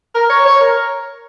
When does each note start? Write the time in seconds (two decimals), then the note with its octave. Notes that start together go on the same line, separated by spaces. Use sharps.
0.15 A#4
0.30 C#5
0.46 C#5
0.61 A#4